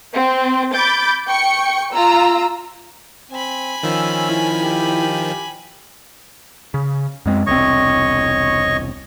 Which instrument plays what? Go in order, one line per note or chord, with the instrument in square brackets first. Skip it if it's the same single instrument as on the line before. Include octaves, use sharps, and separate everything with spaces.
[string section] C4
B5 D6 G6 A6
G5 C#6 C#7
F4 A#5 E6
[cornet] C4 [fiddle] G#5 B5
[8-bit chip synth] D#3 F3 [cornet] C#4 [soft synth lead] E6
[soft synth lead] E4
[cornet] G4
[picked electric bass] C#3
F#2 G#3 C4
[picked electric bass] E1 C2 C4 [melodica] C#5 D#5 C#6